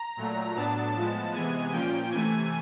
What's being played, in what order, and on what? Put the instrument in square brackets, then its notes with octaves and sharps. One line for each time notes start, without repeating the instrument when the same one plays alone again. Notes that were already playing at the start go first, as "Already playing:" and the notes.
Already playing: [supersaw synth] A#5
A#2 F#3 A3
A2 F#3 B3 D4 A5
A2 F3 G#3 B3 A5
C3 E3 G#3 B3 G#5
A#2 F3 A#3 C#4 G5
C3 E3 A3 G#5